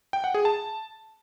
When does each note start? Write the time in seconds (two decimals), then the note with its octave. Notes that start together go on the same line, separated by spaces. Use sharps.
0.13 G5
0.24 F#5
0.34 G#4
0.45 A5